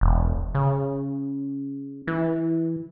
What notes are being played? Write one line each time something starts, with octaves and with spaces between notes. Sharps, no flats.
E1
C#3
E3